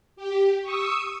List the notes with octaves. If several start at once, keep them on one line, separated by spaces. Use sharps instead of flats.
G4
C#6 D#6 E6